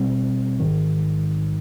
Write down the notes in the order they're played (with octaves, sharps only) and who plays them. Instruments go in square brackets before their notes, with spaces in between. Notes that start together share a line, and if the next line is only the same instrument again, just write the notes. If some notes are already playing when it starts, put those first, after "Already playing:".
Already playing: [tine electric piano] B2 G3 C4
A1 G#2 D#3